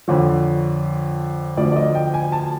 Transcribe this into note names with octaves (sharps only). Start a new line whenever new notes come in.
F2 D3 F3 C#5
D2 D3 F3 D5
D5
D#5
G5
G#5
A5